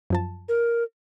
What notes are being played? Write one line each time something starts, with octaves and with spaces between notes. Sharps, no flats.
F#2 F3 A5
A#4